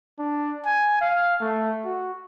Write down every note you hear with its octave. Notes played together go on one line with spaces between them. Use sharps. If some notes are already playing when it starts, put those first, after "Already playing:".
D4
G#5
F5
A3
F#4